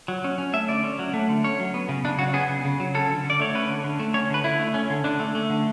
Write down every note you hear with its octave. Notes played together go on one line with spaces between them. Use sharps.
F#3
C#4
C#4
A3 E5
D3 D5
C#4
F#3
A3
D3
C#4 C#5
F#3
B3
C#3
C#3 D4
F#3 F#4
B3 G#4
C#3
C#3
F#3
C#4 A4
D3
D3
D5
A3 C#5
C#4 B4
D3
D3
A3
C#4 C#5
D3 B4
D3 E4
A3
C#4
D3
D3 D4
A3
A3
D3